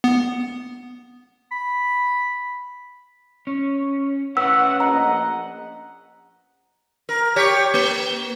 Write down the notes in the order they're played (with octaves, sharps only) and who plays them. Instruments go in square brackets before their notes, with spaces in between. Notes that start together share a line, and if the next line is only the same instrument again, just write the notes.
[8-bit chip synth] B3
[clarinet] B5
[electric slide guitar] C#4
[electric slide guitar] A3 C#4 B4 [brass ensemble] F#5 [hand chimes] E6
[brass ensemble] A#1 D#5 F#5 [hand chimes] A#5
[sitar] A#4
G4 C#5
A#3